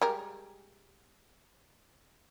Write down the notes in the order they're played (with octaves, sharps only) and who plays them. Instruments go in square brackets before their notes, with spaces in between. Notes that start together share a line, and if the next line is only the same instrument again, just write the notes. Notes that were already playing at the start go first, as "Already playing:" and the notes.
[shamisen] G3 G#3 A#4